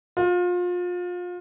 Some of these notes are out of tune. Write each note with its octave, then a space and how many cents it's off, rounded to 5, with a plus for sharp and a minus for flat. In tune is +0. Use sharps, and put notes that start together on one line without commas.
F4 +30